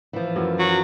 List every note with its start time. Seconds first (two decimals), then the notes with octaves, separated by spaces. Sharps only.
0.13 E3 F3
0.36 F#2 E4
0.59 F#3